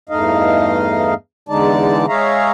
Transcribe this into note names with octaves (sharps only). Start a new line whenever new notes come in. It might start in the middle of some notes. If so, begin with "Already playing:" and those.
E2 G2 A3 D#4 D#5 F5
E2 D3 G#3 D#4 D5 A5
G#3 G#4 C#5 E5 F5 A#5